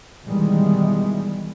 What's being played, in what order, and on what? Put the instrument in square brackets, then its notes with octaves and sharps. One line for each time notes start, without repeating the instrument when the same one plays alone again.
[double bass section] B2 D#3 E3 G3 G#3